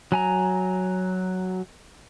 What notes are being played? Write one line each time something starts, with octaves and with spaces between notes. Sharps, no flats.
F#3 G#5 A#5